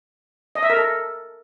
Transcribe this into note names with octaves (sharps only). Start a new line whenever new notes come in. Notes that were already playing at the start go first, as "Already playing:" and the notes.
D#5
E5
A#4
A4